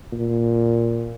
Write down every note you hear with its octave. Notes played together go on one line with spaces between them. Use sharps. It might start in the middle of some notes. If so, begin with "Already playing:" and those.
A#2